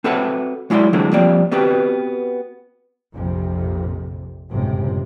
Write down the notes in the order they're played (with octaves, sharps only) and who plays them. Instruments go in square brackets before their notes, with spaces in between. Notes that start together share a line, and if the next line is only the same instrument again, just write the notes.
[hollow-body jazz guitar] C4 F#4 A4 B4 E5 F#5
F#3 G#3 E4 D5 C6
D3 E3 F#3 G#3 A3 C4
F3 G3 A#3 C4 D5
B3 C4 F#4 G4 B4
[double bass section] A#1 F2 C3
G1 C#2 F#2 A2 C3